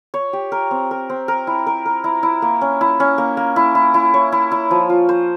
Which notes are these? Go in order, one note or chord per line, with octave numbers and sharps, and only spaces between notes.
C#5
G4
A#4
C4
A#4
C4
A#4
E4
A#4
A#4
E4
E4
A#3
C#4
E4
C#4
A#3
A#3
E4
E4
E4
C#5
E4
E4
F3
F4
C5